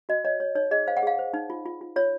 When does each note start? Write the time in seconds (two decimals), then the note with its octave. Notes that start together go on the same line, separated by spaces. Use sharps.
0.09 F#4 D#5
0.25 C#5 D#5
0.40 C#5
0.55 D#4 C#5
0.71 G#4 D#5
0.87 C5 F5
0.97 F#5
1.03 G#4 F5
1.19 C5
1.34 D#4
1.50 F4
1.66 F4
1.81 F4
1.96 F4 C#5